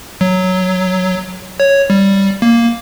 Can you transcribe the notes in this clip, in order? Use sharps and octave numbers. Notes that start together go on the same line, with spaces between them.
F#3
C#5
G3
A#3